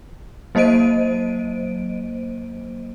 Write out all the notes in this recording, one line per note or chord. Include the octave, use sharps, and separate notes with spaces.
F#3 A#3 C5 D#5 D7 D#7